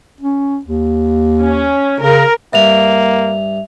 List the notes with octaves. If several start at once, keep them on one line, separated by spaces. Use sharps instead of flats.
C#4
D#2
C#4
C#3 A#4
G2 A#3 E5 F7